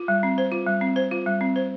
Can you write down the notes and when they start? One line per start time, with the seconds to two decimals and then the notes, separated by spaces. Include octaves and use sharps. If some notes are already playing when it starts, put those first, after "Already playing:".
Already playing: F4
0.08 G3
0.23 C4
0.38 C5
0.52 F4
0.66 G3
0.81 C4
0.96 C5
1.11 F4
1.26 G3
1.41 C4
1.56 C5